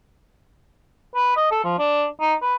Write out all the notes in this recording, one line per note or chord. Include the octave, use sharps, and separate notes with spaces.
B4
D#5
A4
F3
D4
D#4
B4